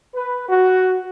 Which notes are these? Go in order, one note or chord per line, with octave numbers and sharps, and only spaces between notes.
B4
F#4